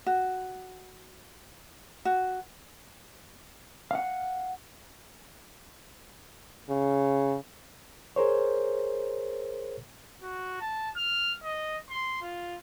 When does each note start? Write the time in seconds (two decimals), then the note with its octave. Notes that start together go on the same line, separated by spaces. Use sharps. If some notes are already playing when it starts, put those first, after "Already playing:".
0.06 F#4
2.05 F#4
3.91 F5 F#5
6.70 C#3
8.16 G#4 A#4 C5 C#5
10.23 F#4
10.61 A5
10.96 F6
11.44 D#5
11.90 C6
12.22 F4